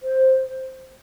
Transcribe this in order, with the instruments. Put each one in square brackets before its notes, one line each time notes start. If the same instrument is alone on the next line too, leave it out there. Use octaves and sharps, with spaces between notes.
[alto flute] C5